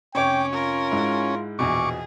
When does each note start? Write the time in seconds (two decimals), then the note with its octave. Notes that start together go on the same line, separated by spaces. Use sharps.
0.15 F1 C#4 C#5 G5 D6
0.53 F4 A#4
0.91 G#2 G#3 E4
1.59 A#1 E2 B2 G#4 C#6 D6